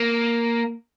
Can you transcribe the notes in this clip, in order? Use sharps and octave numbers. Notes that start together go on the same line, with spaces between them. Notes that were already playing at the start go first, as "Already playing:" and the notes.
Already playing: A#3